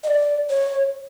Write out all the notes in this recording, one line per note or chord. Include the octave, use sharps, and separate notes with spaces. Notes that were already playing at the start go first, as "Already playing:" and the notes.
D#5
D5
C#5